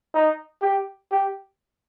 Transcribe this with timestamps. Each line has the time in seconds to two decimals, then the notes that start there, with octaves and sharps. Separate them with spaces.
0.14 D#4
0.62 G4
1.12 G4